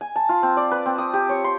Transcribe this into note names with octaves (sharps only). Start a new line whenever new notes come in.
G#5
A5
F4
C4
D5
B4
C4
D#6
G4
C#5
C6